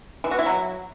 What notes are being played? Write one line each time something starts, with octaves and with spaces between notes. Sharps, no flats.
E3
F#4
E4
F#3